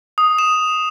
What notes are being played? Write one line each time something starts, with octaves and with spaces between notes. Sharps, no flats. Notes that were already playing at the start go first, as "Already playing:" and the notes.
D#6
E7